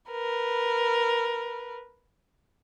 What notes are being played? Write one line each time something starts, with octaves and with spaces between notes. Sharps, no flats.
A#4 B4